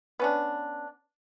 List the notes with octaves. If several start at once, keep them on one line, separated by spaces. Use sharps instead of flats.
B3 C#4 D4